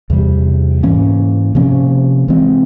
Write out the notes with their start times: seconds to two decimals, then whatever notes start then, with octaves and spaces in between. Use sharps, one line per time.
0.10 E2 C3 G3
0.83 G#2 E3 A#3 C#4
1.55 C3 F3 A#3 C#4
2.28 C3 E3 G#3 C4